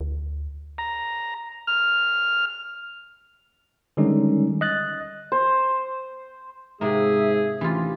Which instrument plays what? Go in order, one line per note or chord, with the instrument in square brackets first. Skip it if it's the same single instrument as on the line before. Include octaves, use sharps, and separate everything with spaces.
[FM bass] D2
[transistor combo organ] A#5
F6
[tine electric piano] D3 D#3 G3 G#3 C#4 D#4
D#5 F#6 A6
[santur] C5
[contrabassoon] G#2 [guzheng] C3 A#3 [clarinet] G#4 [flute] E5
[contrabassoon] A1 [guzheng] E3 F4 [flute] G4